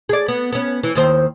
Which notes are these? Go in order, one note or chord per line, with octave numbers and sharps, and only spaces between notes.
G#4 D5
B3
B3 C#4
E3
D#2 D#3 C5